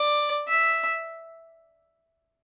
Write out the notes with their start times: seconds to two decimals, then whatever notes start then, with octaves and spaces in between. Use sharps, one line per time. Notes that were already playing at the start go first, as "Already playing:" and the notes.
Already playing: D5
0.48 E5